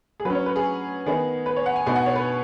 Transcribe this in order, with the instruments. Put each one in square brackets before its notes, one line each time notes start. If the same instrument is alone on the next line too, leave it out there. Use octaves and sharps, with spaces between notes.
[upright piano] G#4
F#3 C#4 B4
C#5
B4
G#4
D#3 B3 D#4 G#4
B4
C#5
F#5
G#5
B2 B3 D#4 G#5
F#5
C#5
B4